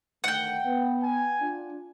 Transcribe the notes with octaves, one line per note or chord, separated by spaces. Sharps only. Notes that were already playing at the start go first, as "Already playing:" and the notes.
D2 D#3 A3 F#5 G5
B3
G#5
D4 F4